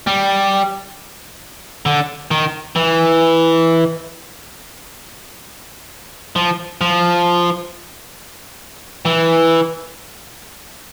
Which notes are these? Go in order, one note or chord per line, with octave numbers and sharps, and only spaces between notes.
G3
D3
D#3
E3
F3
F3
E3